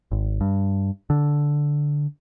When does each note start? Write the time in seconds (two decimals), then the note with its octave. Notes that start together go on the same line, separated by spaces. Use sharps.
0.12 G#1
0.41 G2
1.10 D3